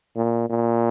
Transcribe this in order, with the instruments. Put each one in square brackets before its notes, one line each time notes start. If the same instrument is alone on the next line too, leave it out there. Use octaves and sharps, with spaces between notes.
[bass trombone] A#2
A#2